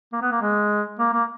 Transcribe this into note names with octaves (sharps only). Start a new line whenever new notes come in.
A#3
B3
A#3
G#3
A#3
A#3